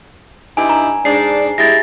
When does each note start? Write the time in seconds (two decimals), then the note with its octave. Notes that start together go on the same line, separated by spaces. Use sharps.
0.57 G2 D#4 E4 G#5
0.69 A#5
1.05 G#2 D4 C7
1.58 G#3 E4 G4 A6 A#6